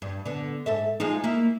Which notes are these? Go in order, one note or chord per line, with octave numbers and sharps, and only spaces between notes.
G2
D3 B3
G#2 A4 E5
F3 G#3 D#4
A#3 E4